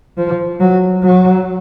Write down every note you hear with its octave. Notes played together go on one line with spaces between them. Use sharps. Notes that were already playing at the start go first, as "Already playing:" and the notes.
F3
F#3
F#3